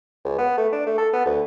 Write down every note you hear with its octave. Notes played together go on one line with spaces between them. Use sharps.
C#2
B3
A3
D4
A3
A4
B3
D2